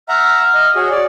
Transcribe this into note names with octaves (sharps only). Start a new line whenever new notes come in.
E5 F#5 A#5 F6
D#5
F#4 G#4 C#5
D5